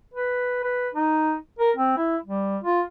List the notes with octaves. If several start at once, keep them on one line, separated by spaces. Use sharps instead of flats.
B4
B4
D#4
A#4
C4
E4
G3
F4